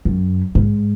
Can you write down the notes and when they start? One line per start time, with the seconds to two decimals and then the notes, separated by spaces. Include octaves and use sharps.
0.05 F#2
0.55 G#2